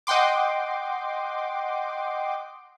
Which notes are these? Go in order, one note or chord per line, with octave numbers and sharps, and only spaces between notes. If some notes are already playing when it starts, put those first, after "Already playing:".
D#5 F#5 G5 C6 D6